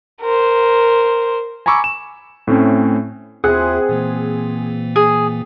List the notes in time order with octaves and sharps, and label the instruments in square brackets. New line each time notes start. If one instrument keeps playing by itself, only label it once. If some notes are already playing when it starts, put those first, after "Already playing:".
[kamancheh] A#4 C5
[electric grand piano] G#5 A#5 B5 C#6 D6 E6
E7
A2 A3 C4 C#4
[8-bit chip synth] D#2 F4 E5 [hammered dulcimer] C4 C6 [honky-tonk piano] G#4 [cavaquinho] F#5
[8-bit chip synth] A#2 E3 A#3
[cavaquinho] G#4